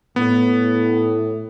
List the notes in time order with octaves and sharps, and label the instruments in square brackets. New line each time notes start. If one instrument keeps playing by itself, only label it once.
[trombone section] A2 [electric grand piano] B3